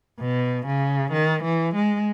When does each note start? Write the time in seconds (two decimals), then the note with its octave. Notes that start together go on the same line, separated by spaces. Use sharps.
0.20 B2
0.67 C#3
1.13 D#3
1.44 E3
1.75 G#3